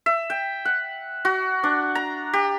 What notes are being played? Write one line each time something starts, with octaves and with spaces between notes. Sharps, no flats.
E5
G5
F#5
F#4
D4
A#5
G4